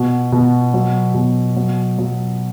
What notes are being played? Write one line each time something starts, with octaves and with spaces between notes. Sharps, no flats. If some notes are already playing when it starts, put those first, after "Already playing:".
Already playing: B2 F#4
B2
F#3
B2
F#3
F#3